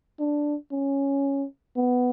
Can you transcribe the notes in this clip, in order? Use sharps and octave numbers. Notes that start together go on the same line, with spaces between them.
D4
C#4
B3